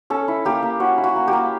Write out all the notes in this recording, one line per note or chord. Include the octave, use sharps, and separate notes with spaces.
C#4 A4
E4
A#3 G4
A#3
C#4 F#4
E4
F#4
A#3
G4
A#3